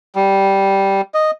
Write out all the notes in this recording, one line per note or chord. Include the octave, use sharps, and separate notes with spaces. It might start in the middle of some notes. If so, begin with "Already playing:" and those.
G3
D#5